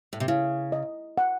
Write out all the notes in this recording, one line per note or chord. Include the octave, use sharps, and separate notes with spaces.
A2
C3
C#3 E4
D#5
F#5